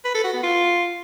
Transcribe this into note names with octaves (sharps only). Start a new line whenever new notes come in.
B4
A4
F#4
B3
F4